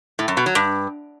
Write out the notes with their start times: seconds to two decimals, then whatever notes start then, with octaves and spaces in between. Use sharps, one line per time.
0.19 A2
0.28 F#2
0.37 B2
0.46 F#3
0.55 G2